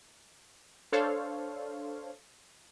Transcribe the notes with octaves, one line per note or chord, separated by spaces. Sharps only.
D4 A4 C5 C#5 F5